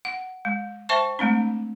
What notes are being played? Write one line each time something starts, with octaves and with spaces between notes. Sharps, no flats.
F#5
G#3
C5 E5 G5 A5 C#6
G#3 A3 C4 D4